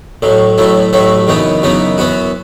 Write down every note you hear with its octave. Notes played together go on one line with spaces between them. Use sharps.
A1 A2 F#3
A1 A2 F#3 A3 E4
A1 A2 F#3 A3 E4
F#2 C#3 E3 B3 D#4
F#2 C#3 E3 B3 D#4
F#2 E3 B3 F#4